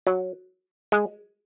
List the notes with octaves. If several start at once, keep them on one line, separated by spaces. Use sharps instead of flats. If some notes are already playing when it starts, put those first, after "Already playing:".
F#3
G#3